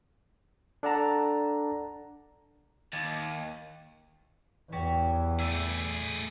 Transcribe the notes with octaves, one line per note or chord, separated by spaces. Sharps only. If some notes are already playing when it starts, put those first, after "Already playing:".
D4 A4 D5 F#5 A5 A#5
D#2
E2 E3 F#4 G4 C#5
A3 E4 G#4 B4 D5